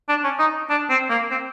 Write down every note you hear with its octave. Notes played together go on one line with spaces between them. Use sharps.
D4
C#4
D#4
D4
C4
A#3
C4